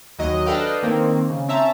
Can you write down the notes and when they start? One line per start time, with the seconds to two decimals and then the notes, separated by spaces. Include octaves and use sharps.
0.19 D#2 F#3 D#5
0.46 D4 A4 B4 D#5 F5 G5
0.83 D#3 A#3 C4
1.30 C#3
1.48 C4 C#4 E5 A5 A#5